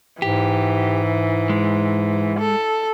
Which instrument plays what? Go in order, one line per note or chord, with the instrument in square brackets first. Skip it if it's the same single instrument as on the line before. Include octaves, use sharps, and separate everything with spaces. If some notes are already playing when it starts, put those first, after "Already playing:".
[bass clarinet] G#2 [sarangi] E3 [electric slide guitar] G4
[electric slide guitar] G#3
[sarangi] A4